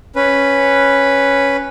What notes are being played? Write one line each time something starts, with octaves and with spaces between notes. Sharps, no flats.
C#4 B4